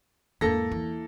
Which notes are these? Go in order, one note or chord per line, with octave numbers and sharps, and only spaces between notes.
E2 G#2 A#3 A4 A#6
E3